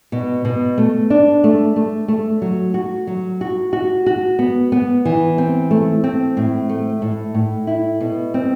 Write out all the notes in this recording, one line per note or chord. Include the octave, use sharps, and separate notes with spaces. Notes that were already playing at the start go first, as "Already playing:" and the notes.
B2
B2
A3
D4
A3
A3
A3
F#3
F#4
F#3
F#4
F#4
F#4
B3
B3
E3
C4
A3
C4
A2
A3
A2
A2
E4
B2
C4